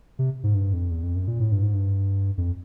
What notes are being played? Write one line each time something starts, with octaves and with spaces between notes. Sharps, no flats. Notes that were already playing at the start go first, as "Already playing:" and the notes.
C3
G#2
G2
F2
E2
F2
F#2
A#2
A2
G2
G#2
G2
F2